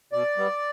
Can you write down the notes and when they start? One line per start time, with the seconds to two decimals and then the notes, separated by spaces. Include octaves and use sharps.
0.12 B2 D5
0.37 G3 B3